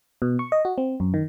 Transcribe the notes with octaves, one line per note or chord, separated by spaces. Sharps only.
B2
C#6
D#5
F#4
C4
F#2
D#3